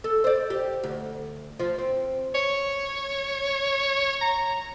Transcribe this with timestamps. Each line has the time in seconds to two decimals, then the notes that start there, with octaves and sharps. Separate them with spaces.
0.04 A4
0.24 C5 D5
0.50 G4
0.84 D2
1.60 F3
1.78 C4
2.35 C#5
4.21 A#5